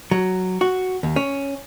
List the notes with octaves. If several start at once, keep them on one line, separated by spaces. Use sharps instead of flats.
F#3
F#4
D#2
C#4